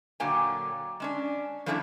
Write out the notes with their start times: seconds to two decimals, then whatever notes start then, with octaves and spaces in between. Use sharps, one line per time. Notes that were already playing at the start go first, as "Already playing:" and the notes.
0.20 A#2 D3 F#3 A#3 G5 G#5
1.00 G#3 C#4 D4
1.66 F3 G3 A3 C#4 D4 E4